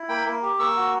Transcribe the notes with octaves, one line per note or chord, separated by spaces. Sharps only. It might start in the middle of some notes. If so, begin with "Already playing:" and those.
Already playing: E4
A#3 G5 B5
A#3
G4
A#3 C#6 E6
F#4